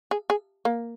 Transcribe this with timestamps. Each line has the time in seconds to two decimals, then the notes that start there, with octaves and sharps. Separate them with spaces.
0.11 G#4
0.30 G#4
0.65 A#3